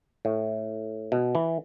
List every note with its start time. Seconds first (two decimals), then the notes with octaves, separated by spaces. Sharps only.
0.25 A2
1.12 B2
1.35 E3